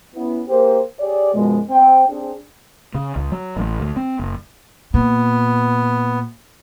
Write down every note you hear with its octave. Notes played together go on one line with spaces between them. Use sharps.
B3 C#4 E4
A#3 G4 G#4 A#4 C5
G4 G#4 C#5 D5
F#2 B2 F3 G#3
C4 G5
C4 D4 G#4
C#3
C#2
F#3
A1
D2
C4
F#1
A#2 B3